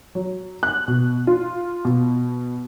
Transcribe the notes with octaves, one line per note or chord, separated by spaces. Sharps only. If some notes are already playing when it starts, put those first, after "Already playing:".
F#3
F#6
B2
F4
B2